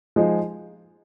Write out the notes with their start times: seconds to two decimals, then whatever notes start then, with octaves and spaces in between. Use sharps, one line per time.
0.16 F3 G#3 D#4 G#4